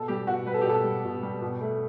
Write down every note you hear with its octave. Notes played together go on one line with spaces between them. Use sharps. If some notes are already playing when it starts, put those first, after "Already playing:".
Already playing: B2 A4
G3 G4
B2 F#4
G3 B4
A4
G4
B2 A4
G3
B2
G3
B2
A3